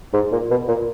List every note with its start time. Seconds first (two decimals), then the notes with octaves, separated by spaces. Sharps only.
0.13 G#2
0.32 A#2
0.51 B2
0.68 A#2